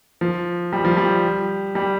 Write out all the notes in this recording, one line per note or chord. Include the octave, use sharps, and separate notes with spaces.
F3
G3
F3
G3
G3